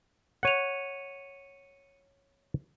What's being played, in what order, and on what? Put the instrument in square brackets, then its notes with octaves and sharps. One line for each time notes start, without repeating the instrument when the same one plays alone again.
[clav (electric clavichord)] C#5 F#5 [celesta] C#7 D#7 F7